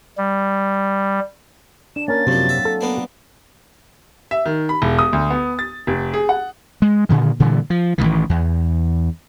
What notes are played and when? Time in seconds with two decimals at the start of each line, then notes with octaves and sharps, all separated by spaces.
0.18 G3
1.96 D4 E7
2.08 A#3 C#4 A#4 A6
2.27 F#2 C3 F3 F#3 C4
2.49 E5
2.65 A4
2.81 A#3 B3 D4
4.31 E5
4.45 D#3
4.69 B5
4.82 E1
4.99 D#6
5.13 D2
5.30 B3
5.59 A6
5.87 F1
6.14 G#4
6.29 F#5
6.82 G#3
7.09 A#2 D3 D#3
7.40 A#2 D3 E3 G3
7.70 F3
7.98 A1 A#2 D#3 E3
8.29 E2